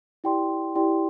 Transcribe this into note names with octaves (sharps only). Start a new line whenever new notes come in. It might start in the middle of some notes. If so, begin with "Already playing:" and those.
E4 G4 D5 G5 C6
E4 G4 D5 G5 C6